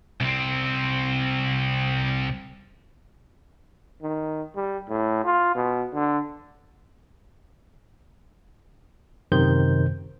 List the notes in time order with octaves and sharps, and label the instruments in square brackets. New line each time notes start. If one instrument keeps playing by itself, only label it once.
[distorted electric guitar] C2 C4
[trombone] D#3
G3
A2
F4
B2
D3
[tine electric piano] F#2 C3 D#3 C5 G6